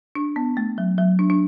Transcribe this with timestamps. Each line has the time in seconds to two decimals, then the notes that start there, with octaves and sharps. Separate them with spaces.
0.15 D4
0.36 B3
0.57 A3
0.78 F#3
0.98 F#3
1.19 D4
1.30 D4